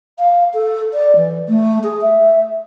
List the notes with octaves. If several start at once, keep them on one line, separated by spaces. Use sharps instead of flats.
F5
A4
D5
E3
A3
G#4
E5